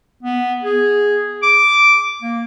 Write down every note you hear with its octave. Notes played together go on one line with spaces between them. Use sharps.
B3
G#4
D6
A#3